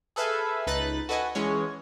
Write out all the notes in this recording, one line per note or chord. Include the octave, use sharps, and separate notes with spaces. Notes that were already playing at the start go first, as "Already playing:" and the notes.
G#4 A4 B4 E5 F5 G#5
C#2 D#4 B4 F#6 A6
F#4 A4 B4 D#5 F#5 G#5
E3 G#3 C#4 C#5